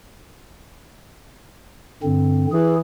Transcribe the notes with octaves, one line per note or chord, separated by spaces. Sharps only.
G2 D3 C4
E3 G#4